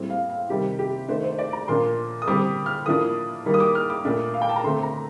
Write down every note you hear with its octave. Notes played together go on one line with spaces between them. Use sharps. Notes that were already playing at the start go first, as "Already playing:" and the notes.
Already playing: A2 G3 C4
F5
F5
C3 D#3 G3 C4 G4
G4
D#3 A3 D4 C5
C5
D5
A#5
A#2 F3 A#3 D4 C6
D#6
D3 G3 C4 D6
F6
A2 F3 A#3 D4 D#6
D#3 G3 A#3
D#6
D6
F6
D6
A#2 A3 D4
F5
G5
A5
A#5
D3 A3 C4 C6
A#5